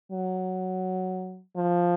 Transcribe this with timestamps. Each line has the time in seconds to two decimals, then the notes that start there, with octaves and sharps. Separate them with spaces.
0.12 F#3
1.56 F3